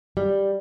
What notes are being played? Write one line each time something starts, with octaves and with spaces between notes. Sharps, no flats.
G3